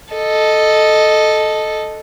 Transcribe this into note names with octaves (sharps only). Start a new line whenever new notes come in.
A4 D#5